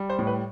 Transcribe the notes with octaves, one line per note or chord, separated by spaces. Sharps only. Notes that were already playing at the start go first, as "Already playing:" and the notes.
Already playing: G3
C5
A2
B4